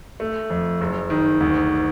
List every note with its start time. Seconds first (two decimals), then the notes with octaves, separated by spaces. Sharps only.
0.20 A3
0.50 F2
0.81 F#1
1.10 D#3
1.40 D2